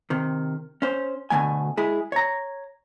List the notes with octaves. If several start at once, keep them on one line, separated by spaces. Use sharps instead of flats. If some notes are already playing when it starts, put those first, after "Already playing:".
C3 D#3
C#4 C5
D2 B2 D3 A3 G#5
G#3 E4 G#4
C#5 A#5